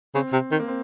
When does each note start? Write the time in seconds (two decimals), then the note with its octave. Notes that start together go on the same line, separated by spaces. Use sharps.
0.15 C#3 C4
0.33 C3
0.51 D#3
0.60 A#3
0.68 C4